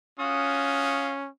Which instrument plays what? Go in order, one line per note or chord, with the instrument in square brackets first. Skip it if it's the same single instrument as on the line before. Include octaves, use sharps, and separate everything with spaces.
[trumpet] C#4 [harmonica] F4 F#4 D#6